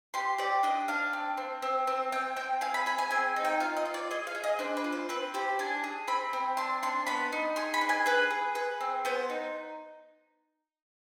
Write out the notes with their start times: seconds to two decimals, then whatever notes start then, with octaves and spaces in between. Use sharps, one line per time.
0.14 G4 C6
0.38 G4 D5
0.63 D4 D#5
0.88 D4 F5
1.13 C4
1.37 C4
1.62 C4
1.87 C4
2.12 C4 G5
2.36 C4 G5
2.61 G#4 F5
2.74 B5
2.86 G#4 B5
2.98 G#5
3.11 C4 G#5
3.36 D#4
3.45 G5
3.60 F4 F5
3.77 D#5
3.85 F4
3.94 D5
4.11 G#4 D#5
4.27 F5
4.35 G#4
4.44 D#5
4.59 D4 C5
4.77 B4
4.84 F4
4.92 C5
5.09 C4 B4
5.34 G4 C5
5.59 D4 G#5
5.84 G#4
6.08 C4 B5
6.33 C4
6.57 D4 C6
6.83 D4 C6
7.07 B3 B5
7.32 D#4
7.56 G#4 C6
7.74 B5
7.81 D4
7.89 G#5
8.06 G#4 B4
8.30 G#4
8.55 G#4 B4
8.81 C4
9.05 B3 C5
9.30 D#4